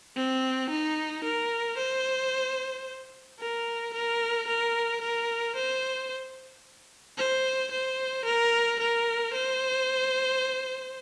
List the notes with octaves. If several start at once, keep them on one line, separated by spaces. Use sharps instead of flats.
C4
D#4
A#4
C5
A#4
A#4
A#4
A#4
C5
C5
C5
A#4
A#4
C5